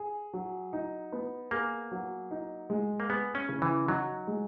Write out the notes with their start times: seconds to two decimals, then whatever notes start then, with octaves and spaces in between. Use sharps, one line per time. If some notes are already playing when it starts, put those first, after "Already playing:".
Already playing: G#4
0.33 F#3
0.73 D#4
1.12 B3
1.51 A#3 G#4
1.92 F#3
2.31 D#4
2.70 G#3
3.00 A#3
3.09 B3 G#4
3.35 C#4
3.49 C#3
3.62 E3
3.88 F#3 D#4
4.27 G#3